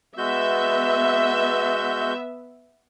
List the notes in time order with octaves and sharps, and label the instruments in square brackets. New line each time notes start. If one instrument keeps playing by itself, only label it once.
[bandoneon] G#3 F#4 G6 [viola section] B3 E5